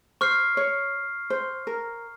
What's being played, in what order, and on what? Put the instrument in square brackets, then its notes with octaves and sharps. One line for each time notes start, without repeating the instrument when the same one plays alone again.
[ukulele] C5 [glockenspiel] C#6 F6 C7
[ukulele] C#5
C5
A#4